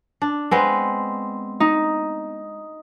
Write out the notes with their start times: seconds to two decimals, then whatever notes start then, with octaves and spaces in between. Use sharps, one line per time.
0.22 D4
0.51 G#3 B3 C4
1.60 D#4